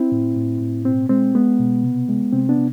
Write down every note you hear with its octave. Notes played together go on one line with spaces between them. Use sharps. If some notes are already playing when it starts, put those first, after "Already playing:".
Already playing: C4 E4
A2
A2
A2
B2 C4
G#3 C4
G#3 B3
B2
C3
G#3
C3 C4
B3 D4
C3